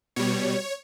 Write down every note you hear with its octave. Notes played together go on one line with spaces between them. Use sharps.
B2 G3 C#5